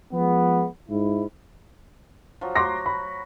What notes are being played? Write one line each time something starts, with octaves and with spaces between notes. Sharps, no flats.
F3 G#3 B3
G#2 E4
F3 F#3
F#4 C6 D6 A#6
B5